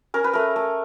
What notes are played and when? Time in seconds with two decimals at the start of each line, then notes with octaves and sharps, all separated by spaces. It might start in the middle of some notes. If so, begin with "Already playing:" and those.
0.14 C#4 A#4
0.24 B4
0.33 A3 A#4
0.56 A3